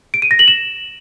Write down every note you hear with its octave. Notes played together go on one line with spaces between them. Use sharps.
D7
D#7
A#6
F#7
E7